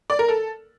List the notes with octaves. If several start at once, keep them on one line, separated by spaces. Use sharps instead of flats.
D5
A#4
A4